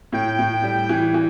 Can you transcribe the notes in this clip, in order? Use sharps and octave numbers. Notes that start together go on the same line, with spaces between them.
A2 G5
A2
G3
E3
E3